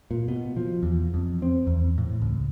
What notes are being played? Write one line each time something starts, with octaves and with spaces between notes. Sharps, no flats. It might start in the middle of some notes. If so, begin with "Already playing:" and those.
A#2
B2
F3
E2
F2
C4
E2
A2
C#2